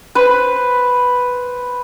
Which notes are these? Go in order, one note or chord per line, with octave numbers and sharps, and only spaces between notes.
B4 C5